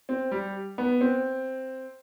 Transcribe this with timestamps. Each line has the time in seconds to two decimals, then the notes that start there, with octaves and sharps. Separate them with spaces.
0.09 C4
0.31 G3
0.78 B3
1.01 C4